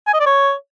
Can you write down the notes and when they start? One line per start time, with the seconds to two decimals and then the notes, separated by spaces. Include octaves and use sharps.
0.07 G#5
0.14 D#5
0.20 D5
0.26 C#5